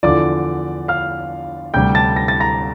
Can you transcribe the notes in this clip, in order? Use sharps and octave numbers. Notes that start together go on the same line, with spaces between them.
E2 D3 F3 D5 D6
F5 F6
D2 C3 G3 G5 G6
A5 A6
A#6
A6
A#5 A#6